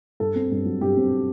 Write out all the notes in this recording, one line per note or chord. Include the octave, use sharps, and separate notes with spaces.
G2 A4
C4
G2
F#3
G2 G4
C4